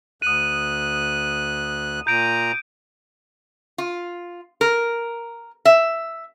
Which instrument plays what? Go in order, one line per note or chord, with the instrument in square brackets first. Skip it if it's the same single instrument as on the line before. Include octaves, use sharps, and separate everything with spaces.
[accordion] D2 F#6 [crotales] D#6 D#7
[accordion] A#2 A#5 [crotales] G6 D7 D#7
[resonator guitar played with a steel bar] F4
A#4
E5